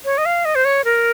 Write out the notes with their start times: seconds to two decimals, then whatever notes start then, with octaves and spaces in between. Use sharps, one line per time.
0.05 C#5
0.18 D#5
0.26 F5
0.45 D#5
0.55 C5
0.65 C#5
0.85 A#4